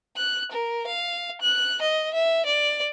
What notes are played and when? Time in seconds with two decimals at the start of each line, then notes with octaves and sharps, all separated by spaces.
0.17 F#6
0.52 A#4
0.87 F5
1.41 F#6
1.82 D#5
2.14 E5
2.46 D5